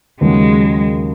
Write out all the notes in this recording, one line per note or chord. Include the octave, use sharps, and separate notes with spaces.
D#2 C#3 F#3 G#3